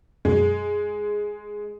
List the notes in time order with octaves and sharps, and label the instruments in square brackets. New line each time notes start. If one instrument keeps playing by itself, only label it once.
[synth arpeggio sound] F#2 B2 [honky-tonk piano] G#3